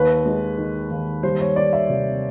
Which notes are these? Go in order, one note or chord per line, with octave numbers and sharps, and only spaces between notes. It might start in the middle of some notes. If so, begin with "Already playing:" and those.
Already playing: D#2 B4
G#3
D#3
D#2
G3 C5
C#5
D#3 D5
E5
C3